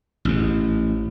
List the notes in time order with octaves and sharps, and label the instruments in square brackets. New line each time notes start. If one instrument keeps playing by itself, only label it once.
[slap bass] A1 G#2